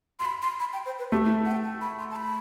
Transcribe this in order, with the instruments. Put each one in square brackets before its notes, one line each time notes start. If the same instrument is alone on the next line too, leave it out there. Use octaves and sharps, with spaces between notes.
[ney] C6
B5
C6
B5
G5
C5
B4
[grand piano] A3 [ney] G4
[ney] E4
F#5
G5
A5
B5
C6
A5
B5